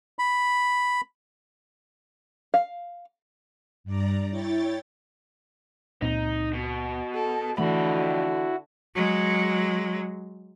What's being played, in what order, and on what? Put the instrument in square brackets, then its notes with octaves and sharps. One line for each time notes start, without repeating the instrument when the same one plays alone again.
[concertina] B5
[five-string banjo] F5
[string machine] G2 D5 A#5
E4 C#5 G5 A6
[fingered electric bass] C#2 A#2 C4 [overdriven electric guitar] D#4
[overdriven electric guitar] B2
[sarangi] A4
[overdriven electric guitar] F2 B5 [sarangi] D3 [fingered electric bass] E3 A3 [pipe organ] E4 F#4
[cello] F#3 G#3